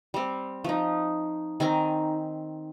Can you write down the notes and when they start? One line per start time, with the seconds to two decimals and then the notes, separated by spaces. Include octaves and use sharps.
0.14 G3 C4
0.64 F3 D#4
1.60 D#3 C4 G#5 A#5